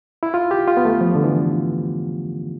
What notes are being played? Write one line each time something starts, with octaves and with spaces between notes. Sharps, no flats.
E4
F4
G4
F4
B3
A3
F3
D3
E3